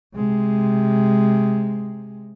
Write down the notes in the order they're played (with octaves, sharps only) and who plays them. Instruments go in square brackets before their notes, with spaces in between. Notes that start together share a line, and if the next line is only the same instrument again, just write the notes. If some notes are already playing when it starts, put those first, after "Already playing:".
[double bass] C3 G#3